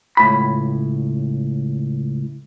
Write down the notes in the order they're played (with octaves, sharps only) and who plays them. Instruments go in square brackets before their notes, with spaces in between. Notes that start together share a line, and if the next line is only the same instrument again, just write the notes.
[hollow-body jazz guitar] C#2 A2 B5